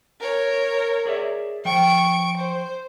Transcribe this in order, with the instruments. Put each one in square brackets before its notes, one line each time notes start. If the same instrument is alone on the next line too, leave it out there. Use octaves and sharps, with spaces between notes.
[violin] A#4 C#5
[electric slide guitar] G#4 D5 E5
[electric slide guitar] F3 G5 [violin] C#6 D7
[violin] C5